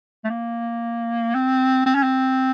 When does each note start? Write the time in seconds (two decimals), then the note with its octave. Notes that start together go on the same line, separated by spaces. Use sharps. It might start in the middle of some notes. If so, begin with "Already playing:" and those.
0.24 A3
0.30 A#3
1.35 C4
1.86 C4
1.95 C#4
2.04 C4